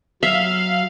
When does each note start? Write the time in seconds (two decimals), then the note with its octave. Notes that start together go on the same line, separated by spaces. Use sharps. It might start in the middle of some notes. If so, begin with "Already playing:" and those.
0.23 F#3 E5 F5 E6 C7 F7